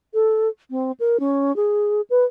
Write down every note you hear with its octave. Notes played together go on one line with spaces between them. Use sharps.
A4
C4
A#4
C#4
G#4
B4